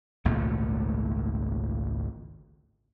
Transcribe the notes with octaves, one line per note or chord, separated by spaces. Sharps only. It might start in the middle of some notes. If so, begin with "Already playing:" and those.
G#1 C#2 A#2 A3